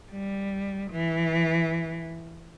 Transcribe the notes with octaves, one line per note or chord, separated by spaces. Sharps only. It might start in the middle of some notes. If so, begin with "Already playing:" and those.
G3
E3